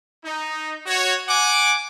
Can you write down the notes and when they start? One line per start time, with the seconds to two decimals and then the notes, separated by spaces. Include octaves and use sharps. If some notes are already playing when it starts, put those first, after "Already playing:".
0.24 D#4
0.86 F#4 C#5
1.28 F#5 G#5 D6